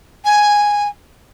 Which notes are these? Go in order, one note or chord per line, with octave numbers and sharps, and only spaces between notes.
G#5